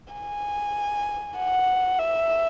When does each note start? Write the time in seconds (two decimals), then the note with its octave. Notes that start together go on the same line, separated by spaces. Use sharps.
0.13 G#5
1.38 F#5
1.99 E5